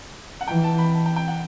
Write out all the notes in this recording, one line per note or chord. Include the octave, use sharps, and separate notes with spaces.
F#5
E3 G5
A5
B5
A5
G5
G5
F#5